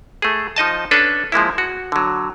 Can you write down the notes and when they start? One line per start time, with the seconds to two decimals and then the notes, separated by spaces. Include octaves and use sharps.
0.22 A3 G#4
0.56 F3 D#4 D#5 A5
0.91 C#4 D4 A4 B4
1.32 F3 G#3 A#3 E4
1.58 F#4
1.92 D3 F#3